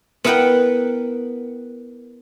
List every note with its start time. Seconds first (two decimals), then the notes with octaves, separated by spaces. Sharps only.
0.24 B3 E4 A#4 B4 F#5 G5